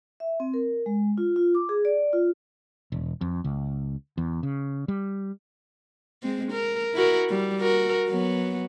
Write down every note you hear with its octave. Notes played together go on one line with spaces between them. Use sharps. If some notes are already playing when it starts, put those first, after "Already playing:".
E5
C4
A#4
G#3
F4
F4
D6
G#4
D5
F4
E1
F2
C#2
E2
C#3
G3
G#3 C4
A#4
E4 F#4 A#4
G3
F#4 A#4
F#3 B3